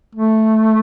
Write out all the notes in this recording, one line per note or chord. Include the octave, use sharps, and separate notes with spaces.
A3